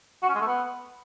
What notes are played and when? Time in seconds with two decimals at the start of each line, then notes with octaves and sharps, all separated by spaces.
0.23 F#4
0.29 C#4
0.35 G#3
0.41 A3
0.47 B3